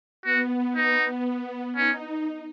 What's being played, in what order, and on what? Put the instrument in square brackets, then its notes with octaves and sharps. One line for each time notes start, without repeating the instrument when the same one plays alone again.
[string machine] B3 [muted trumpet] F#4
[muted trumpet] D#4
[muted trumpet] C#4 [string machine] D#4